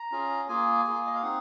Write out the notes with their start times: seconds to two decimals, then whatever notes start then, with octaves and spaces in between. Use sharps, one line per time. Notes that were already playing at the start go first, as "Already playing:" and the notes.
Already playing: A#5
0.12 C#4 F4 G#4
0.48 A#3 F4 G#4 G#5
0.85 A#3 F4 G#4
1.07 D#5
1.14 F5
1.22 C4 D#4 G#4 F#5